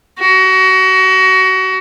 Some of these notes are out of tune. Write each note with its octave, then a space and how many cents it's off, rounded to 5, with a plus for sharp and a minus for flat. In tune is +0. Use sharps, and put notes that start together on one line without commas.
F#4 +30